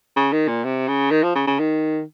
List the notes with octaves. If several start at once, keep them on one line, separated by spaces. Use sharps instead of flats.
C#3
D#3
A#2
C3
C#3
D#3
F3
C#3
C#3
D#3